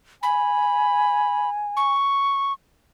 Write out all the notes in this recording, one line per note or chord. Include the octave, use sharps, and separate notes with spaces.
G#5 B5
C#6